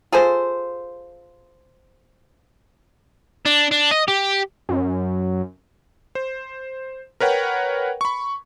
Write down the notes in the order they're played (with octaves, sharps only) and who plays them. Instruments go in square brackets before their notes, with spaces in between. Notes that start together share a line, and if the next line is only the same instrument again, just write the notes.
[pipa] F4 G#4 A4 C5
[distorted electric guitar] D4
D4
D#5
G4
[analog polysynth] F#2
[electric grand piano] C5
A#4 B4 C#5 F#5 G5
B5 C#6